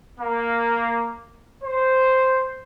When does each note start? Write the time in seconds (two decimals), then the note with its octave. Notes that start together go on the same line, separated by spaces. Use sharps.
0.19 A#3
1.63 C5